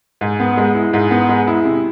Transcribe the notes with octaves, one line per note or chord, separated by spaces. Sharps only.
G#2
B3
G#3
E4
G#2
B3
G#3
E4
C3